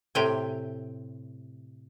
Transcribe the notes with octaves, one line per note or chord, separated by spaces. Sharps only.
A2 C3 G4 G5 G#5